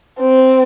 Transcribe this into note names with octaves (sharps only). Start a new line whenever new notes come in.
C4